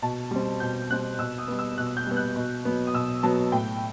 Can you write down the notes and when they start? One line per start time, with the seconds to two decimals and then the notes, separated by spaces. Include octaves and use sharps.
0.02 B2 A5
0.31 G3 C4
0.60 B2 G6
0.90 G3 C4 F#6
1.19 B2 E6
1.38 D#6
1.48 G3 B3
1.59 E6
1.78 B2 F#6
1.97 G6
2.07 G3 B3
2.17 F#6
2.36 B2
2.65 F#3 B3
2.87 D#6
2.94 B2 E6
3.23 F#3 B3 A5
3.52 A2 G5